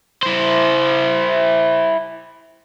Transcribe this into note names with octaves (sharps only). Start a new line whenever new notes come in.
E4 C5